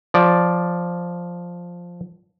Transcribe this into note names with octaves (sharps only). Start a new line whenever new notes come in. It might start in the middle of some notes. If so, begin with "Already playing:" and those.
F3 D5